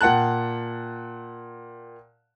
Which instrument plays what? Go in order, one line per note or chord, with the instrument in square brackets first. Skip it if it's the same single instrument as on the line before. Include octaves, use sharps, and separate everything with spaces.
[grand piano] A#2 F#5 G5 A5 F#6